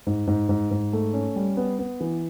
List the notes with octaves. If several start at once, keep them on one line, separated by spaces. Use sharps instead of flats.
G#2
G#2
G#2
G#2
A3
C#4
G3
B3
B3
E3